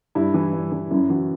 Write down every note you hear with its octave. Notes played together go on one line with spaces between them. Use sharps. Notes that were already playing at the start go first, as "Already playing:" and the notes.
G2 E4
E3
G2
E3
F#2 E4
E3 F#4